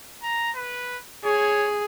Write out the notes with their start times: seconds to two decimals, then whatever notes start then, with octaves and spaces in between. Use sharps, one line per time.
0.22 A#5
0.56 B4
1.24 G#4 C#5